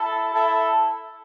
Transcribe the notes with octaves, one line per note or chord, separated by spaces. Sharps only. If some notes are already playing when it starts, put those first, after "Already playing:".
Already playing: E4 A4
E4 A4